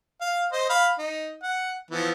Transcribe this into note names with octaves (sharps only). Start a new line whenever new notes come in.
F5
C5 D#5
F5 B5
D#4
F#5
E3 F3 B3